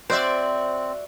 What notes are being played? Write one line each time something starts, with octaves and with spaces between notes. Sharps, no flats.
C4 F#4 C5 D5 E5